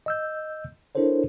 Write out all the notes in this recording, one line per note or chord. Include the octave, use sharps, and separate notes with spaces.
D#5 E6 G6
D4 E4 A4 A#4 C5 C#5